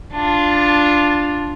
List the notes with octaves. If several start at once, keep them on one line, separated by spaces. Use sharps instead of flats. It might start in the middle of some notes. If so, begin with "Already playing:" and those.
D4 F4